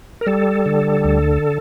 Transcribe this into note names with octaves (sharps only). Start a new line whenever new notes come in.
A#4
G3 A4
D3
D2